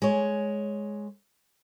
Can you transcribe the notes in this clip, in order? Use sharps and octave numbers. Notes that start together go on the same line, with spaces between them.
G#3 C#5